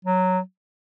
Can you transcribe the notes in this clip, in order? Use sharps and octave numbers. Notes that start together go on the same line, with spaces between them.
F#3